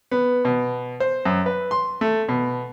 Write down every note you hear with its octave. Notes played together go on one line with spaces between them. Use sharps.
B3
B2
C5
F#2
B4
C6
A3
B2